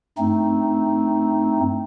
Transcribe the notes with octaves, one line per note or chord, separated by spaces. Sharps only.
G2 A3 C4 D#4